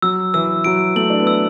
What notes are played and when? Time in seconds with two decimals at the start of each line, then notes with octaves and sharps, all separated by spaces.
0.02 F#3 E6
0.34 E3 E6
0.64 F#3 D7
0.96 A3 F#7
1.10 D4
1.19 B3
1.27 E6